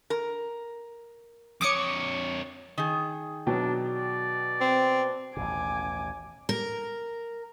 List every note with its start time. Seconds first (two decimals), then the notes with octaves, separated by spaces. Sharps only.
0.10 A#4
1.61 F2 C#5 D6 D#6 C#7
2.78 D#3 G#4
3.47 B2 F#3 D4 G5
3.86 D5
4.61 C4
5.37 A1 D#2 B2 G#5 D6
6.49 A#4